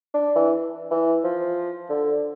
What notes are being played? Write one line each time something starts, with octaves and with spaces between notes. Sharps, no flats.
D4
E3
E3
F3
D3